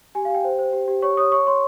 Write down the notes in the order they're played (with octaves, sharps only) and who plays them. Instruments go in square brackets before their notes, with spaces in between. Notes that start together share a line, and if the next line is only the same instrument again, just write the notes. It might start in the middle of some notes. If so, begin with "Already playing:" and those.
[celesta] G4 G#5
F5
G4 G5
C5
C5
G4
G4
C#5 C#6
C#5 D#6
C#5 C#6
C#5 C6